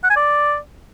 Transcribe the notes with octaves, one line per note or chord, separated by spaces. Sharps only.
F#5
G#5
D5